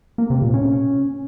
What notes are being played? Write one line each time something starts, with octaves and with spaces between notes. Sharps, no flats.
A#3
C3
A#2
C#4